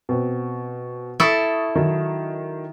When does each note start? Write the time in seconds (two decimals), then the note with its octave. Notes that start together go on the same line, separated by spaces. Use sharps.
0.09 B2 C4
1.20 E4 A4 C#6 D#6 A6
1.75 D#3 F#3